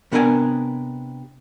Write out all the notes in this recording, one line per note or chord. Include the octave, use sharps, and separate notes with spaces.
C3 B3 D4 A#4 D#5 G#5